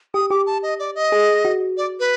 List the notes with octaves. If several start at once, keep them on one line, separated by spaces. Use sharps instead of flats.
G4 D#6
G4 D6
A5
D#5
D5
D#5
G#4
F#4
D5
B4